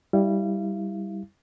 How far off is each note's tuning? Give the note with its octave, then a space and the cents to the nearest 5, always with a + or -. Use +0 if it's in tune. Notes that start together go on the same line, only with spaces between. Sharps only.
G3 +0 E4 -20 F5 -35